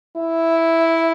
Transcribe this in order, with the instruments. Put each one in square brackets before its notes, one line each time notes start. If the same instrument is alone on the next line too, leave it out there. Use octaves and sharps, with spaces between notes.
[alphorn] E4